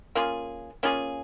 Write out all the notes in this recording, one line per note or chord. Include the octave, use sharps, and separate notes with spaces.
A#3 C#4 F4 G#4
A#3 C#4 F4 G#4